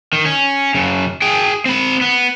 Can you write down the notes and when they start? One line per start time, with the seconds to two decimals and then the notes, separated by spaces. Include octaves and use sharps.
0.13 D#3
0.25 C#4
0.74 F#2 C#3
1.22 G#4 G5
1.66 C4 B5
2.01 B3